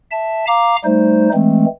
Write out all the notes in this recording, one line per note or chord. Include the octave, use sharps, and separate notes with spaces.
E5 A5
F5 A#5 D6
G3 A3 D#4 C5
E3 G#3 A3 C4